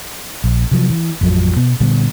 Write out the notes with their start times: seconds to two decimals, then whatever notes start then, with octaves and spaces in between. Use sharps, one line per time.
0.44 A#1
0.71 C3 F3 F#3
0.90 E3
1.21 A1 F2 F3 F#3
1.56 B2 B3
1.80 A#2 D3 G3 B3